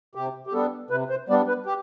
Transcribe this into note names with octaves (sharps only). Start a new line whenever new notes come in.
C3 G4
G4
G3 B3 D4 A4
C3 B4
C5
G3 B3 D4 D5
B4
G4